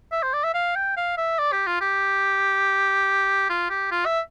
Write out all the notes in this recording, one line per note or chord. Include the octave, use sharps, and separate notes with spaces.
E5
C5
D5
E5
F5
G5
F5
E5
D5
G4
F4
G4
F4
G4
F4
E5